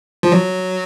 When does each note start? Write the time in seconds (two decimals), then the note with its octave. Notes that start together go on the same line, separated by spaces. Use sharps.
0.23 F3
0.32 F#3